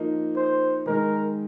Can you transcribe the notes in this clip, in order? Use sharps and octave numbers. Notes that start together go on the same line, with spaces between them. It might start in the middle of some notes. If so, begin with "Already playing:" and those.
Already playing: F3 A#3 D#4
C5
D#3 G#3 D#4 A#4